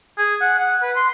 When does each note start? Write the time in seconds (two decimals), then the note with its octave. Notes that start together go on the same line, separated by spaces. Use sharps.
0.18 G#4
0.41 F#5
0.59 F#5
0.82 B4
0.96 C6